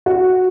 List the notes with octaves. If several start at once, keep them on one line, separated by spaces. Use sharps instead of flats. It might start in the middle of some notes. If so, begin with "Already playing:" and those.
F#4